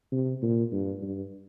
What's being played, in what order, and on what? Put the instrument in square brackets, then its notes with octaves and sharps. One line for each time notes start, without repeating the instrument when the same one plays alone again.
[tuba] C3
A#2
G2
G2